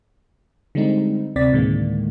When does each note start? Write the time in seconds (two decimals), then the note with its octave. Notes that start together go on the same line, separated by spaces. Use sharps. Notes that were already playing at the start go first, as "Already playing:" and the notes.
0.75 D3 G3 G#3 C4 D#4
1.36 D2 C3 C4 D5 A6 B6
1.52 D2 A2 D3 D#3 G#3 A#3